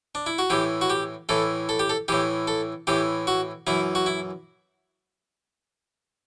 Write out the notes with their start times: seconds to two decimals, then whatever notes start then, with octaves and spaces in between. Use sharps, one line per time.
0.15 D4
0.26 E4
0.38 F#4
0.50 A2 E3 G4
0.81 F#4
0.90 G4
1.29 A2 E3 A4
1.69 A4
1.79 G4
1.89 A4
2.08 A2 E3 G4
2.48 A4
2.87 A2 E3 G4
3.27 F#4
3.67 F#2 E3 E4
3.95 F#4
4.06 E4